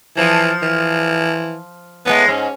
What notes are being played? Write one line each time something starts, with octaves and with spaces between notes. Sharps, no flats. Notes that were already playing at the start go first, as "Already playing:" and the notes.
E3 F3
E3
A2 G#3 B3
G#2 C#4